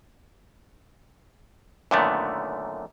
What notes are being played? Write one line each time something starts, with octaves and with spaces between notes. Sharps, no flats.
F#2 A#2 D3 D#3 A3 B3